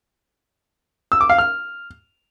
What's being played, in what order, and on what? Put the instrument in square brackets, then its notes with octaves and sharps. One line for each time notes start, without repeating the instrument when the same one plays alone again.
[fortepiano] E6
D6
F5
F6